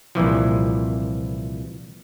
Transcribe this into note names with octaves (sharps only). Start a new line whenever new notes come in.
C2 A#2 E3 F3